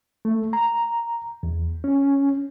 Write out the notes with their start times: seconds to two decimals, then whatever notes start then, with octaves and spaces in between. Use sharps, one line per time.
0.25 A3
0.53 A#5
1.43 E2
1.84 C#4